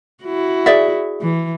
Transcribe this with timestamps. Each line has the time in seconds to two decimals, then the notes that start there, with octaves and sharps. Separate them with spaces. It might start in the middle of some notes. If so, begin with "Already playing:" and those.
0.24 E4 F#4
0.66 G#4 D5 E5
1.21 E3